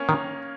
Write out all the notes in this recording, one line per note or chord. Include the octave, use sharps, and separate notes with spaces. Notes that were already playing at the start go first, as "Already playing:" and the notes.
Already playing: A#3 C#4
D#3